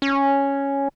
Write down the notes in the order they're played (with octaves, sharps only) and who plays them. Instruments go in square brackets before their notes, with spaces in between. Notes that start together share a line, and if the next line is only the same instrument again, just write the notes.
[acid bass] C#4